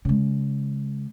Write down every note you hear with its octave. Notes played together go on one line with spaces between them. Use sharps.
C#3 G#3